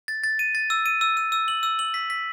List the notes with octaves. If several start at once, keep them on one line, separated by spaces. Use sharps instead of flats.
A6
A6
D#7
A6
E6
D#7
E6
E6
E6
F#7
E6
F#7
B6
B6